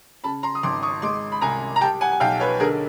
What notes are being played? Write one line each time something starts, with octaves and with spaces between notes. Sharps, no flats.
C#3 A5 B5
A#5 C6
D#6
G#1 C6 D6
C#6 D#6
G#3 C6 D6
B5
C2 G#5 A#5
A#5
G3 G5 A5
F#5 G#5
G#5
B1 F5 G5
B4 C#5
D3 G#4 A#4